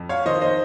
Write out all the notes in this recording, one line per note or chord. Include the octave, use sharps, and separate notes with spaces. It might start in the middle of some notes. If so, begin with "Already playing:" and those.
Already playing: F2
C#5 F5
D#3 C5 D#5
C5 D#5